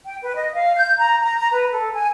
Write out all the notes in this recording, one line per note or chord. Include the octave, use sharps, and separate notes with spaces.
G5
B4
D#5
F5
G6
A#5
A#5
A#5
B4
A4
G#5